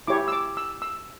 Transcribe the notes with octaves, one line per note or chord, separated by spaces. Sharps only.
E4 G4 C#5 D6
E6
D6
E6
E6